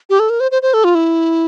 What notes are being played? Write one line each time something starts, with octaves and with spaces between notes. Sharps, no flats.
G4
A4
A#4
C5
C5
C5
A4
F4
E4